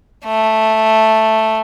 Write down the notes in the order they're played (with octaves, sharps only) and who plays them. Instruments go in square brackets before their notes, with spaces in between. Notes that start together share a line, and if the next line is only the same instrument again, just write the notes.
[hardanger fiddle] A3